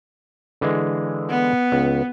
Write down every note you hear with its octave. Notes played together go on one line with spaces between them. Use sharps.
D3 E3 G#3
B3
C#2